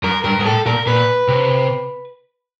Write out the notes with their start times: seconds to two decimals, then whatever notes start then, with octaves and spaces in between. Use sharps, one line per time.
0.03 F#2 A#4
0.24 G2 A#4
0.39 G#2
0.45 A2 A4
0.66 A#2 A#4
0.87 A#2 B4
1.28 C3